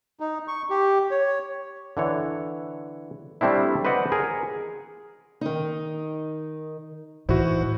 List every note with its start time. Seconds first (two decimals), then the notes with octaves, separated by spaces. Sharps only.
0.20 D#4
0.48 C#6
0.70 G4
1.11 C#5
1.97 D3 E3 C#5
3.41 G3 A3 C4 D4 E4
3.85 B4 C5 D5 D#5 F#5
4.12 G#4 A#4
5.41 D#3 D#4
7.29 A2 E3 D#4 E4 F#4 C5